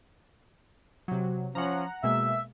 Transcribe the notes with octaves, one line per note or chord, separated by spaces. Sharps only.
C3 F#3
F3 C#4 F#5 A#5
B2 G#3 A#3 E5